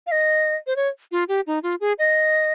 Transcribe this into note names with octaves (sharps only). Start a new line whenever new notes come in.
F5
D#5
C5
C#5
F4
G4
D#4
F4
G#4
D#5